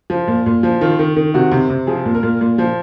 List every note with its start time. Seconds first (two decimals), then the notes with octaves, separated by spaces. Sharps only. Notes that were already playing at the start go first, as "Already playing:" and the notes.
0.10 F3
0.28 A#2
0.46 A#2
0.63 F3
0.81 D#3 F4
0.99 D#3
1.16 D#3
1.34 C3 F#4
1.51 C3
1.70 C3
1.87 F3 G#4
2.05 A#2
2.15 A#4
2.23 A#2
2.41 A#2
2.58 F3